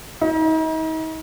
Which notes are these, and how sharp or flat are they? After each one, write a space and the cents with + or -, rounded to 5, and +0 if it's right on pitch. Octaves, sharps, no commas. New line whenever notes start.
D#4 +40